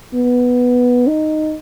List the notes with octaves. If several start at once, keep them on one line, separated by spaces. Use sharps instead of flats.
B3
D#4